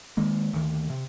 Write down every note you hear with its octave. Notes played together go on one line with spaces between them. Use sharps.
D#3 G#3 A#3
D2 D#3
C3